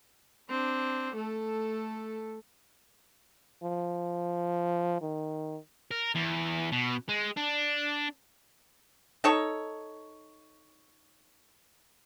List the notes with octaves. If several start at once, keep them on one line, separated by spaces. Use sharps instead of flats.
C4 D4
A3 A4
F3
D#3
A#4
E2
B2
G#3
D4
D#4 A4 C#5